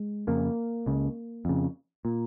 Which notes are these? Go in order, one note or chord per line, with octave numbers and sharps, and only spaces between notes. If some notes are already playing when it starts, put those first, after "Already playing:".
Already playing: G#3
F2 C#3 A#3
C#2 C#3
F2 C#3
A#2